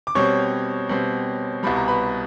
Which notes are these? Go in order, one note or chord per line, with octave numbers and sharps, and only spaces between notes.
D6
B2 G3 C4 C#5 C#6
B2 G3 C4
C2 B2 G3 B5
A#5
B4 B5